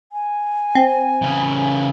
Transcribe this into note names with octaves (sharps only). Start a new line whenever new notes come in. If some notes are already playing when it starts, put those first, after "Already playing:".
G#5
C4
C#3 E3